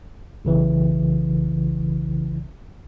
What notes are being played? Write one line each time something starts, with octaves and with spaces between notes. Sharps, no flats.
B1 C#3 E3